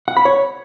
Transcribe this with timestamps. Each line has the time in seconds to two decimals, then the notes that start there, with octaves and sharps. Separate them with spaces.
0.08 F#5
0.17 B5
0.25 C#5